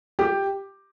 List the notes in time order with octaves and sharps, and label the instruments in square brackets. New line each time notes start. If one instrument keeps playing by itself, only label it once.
[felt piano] G4